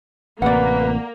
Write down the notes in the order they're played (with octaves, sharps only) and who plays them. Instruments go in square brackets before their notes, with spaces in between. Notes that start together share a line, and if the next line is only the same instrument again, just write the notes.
[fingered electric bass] A1 C3 [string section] A#3 [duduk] B4 [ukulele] D5 F#5